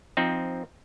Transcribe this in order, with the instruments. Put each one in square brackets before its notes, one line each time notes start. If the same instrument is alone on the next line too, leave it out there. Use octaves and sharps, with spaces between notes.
[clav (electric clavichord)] F3 C4 D#4